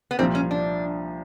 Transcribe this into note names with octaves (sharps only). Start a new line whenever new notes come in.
B3
C2 A#2 F3 C4
C#4
D4